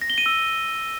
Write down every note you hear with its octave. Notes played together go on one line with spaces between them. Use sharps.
A#6
G7
D#7
E6